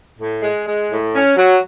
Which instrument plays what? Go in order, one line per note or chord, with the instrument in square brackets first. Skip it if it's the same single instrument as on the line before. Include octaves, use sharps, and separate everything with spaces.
[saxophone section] A2
G#3
G#3
A2
C#4
F#3